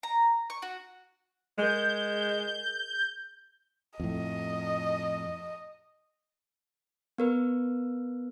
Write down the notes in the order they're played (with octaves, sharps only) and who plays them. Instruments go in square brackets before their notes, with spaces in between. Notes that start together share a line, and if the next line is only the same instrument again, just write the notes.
[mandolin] A#5
C#6
F#4
[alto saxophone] G#3 [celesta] G#4 A#4 [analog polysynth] G6
[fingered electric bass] F2 A2 [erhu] D#5
[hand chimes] B3 A#4 B4